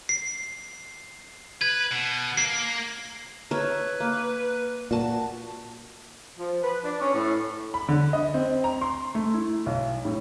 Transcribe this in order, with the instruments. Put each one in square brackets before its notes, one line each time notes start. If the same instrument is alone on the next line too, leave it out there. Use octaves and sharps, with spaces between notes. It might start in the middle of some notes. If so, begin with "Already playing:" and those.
[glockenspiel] C7
[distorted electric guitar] B4 [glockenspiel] G#6
[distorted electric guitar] B2
[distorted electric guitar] A#3 [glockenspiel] C7
[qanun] A#4 C#5 E5 [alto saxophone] B4
[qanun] A#3
[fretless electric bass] A#2 [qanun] F#4 A5
[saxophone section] F3
B4
D4
C#4
A2
[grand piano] B5
D3
D#5
C4
A#5
C6
A3
E4
B1
A2